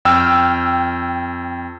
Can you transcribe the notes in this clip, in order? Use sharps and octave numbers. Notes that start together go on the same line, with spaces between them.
F2 G5 E6 F6